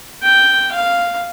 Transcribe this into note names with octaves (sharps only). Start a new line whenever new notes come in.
G5
F5